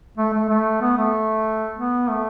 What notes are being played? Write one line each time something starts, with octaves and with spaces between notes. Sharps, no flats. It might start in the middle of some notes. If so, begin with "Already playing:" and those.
A3
A3
A3
B3
A3
B3
A3